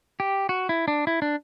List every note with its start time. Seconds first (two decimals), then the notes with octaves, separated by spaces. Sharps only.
0.20 G4
0.49 F#4
0.69 E4
0.88 D4
1.07 E4
1.22 D4